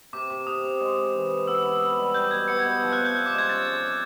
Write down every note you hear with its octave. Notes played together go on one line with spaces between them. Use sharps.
C3 D6
C3 D6
C3 D#6
C3
G#3
G#3
E3
C3
B3 E6
E4
B3
G3
G3 G6
B2 G#6
B3 C#7
G#6
B2
G6
F3
F#6
C3
G6
C3 F#6
D6
G#3
G#6
C#4 A6
G#3
C3